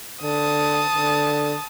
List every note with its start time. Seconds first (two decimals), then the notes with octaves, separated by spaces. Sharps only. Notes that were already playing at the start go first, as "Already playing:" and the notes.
0.23 D3 A5 D#6
0.95 D3